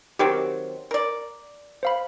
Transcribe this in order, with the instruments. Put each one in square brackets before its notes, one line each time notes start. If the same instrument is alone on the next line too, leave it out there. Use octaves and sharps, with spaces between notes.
[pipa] D#3 F#3 C4 [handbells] G4 G5 D6
[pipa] A#4 D5
[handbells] C5 F5 B5